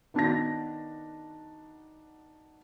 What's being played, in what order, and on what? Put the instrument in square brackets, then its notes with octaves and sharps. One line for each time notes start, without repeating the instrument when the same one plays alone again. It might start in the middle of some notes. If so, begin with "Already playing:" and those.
[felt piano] D#3 B3 D4 F#4 A5 A#6